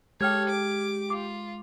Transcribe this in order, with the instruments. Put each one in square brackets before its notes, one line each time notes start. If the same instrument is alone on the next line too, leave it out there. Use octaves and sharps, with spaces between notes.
[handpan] G#3 [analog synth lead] G4 [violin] A4 C#5 [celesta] G5 F6 G#6
[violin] D6
[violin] F4 [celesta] D6